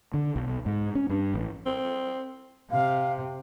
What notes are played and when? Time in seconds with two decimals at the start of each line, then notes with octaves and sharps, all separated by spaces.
0.14 D3
0.36 B1
0.66 G#2
0.95 C#4
1.10 G2
1.34 A1
1.66 C4
2.71 C3 F5